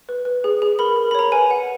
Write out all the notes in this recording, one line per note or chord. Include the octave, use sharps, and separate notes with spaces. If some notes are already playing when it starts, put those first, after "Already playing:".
B4
B4
G#4
G#4
A#4 B5
A#4
B5
C#5 A#5
B4 G#5
F#5